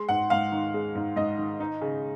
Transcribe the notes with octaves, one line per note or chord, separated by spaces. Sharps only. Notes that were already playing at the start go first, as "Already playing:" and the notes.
Already playing: G#3 C6
G#2 F#5
G#2 F5
D#3
G#3
G#2
G#2 D#5
D#3
D#4
C#3